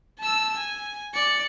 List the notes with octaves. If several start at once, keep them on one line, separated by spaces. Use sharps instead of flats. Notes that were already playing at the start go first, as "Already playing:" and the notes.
A5 E6
G#5
D5 C#7